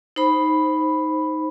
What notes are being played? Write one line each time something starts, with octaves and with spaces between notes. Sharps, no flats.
D#4 C5 B5